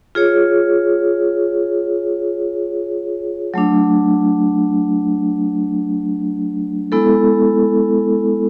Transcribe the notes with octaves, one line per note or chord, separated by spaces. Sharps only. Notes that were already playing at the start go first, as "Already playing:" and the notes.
F4 G#4 C#5
F#3 A3 D4
G#3 B3 E4 A4